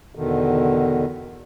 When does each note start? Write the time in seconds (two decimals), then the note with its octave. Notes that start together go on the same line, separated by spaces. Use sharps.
0.15 E2 B2 D3 D#3